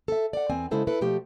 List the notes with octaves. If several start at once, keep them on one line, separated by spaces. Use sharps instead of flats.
A4 E5
D5 F#5
E2 C4 G#5
C#3 G#3 E4 A4 C5
E4 A4 B4
B2 F3 A3 G4